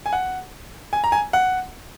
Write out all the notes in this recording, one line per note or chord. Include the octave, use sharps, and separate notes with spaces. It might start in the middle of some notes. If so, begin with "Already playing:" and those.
G#5
F#5
G#5
A#5
G#5
F#5